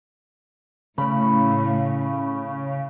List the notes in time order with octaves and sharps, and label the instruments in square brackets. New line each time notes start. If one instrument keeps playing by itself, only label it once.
[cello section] A2 [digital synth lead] C#3 [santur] B5